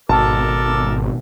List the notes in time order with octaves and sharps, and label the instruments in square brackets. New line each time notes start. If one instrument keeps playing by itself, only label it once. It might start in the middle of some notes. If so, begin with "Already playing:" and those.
[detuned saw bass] G#1 [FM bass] B2 [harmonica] A4 A#4 D6 [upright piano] A5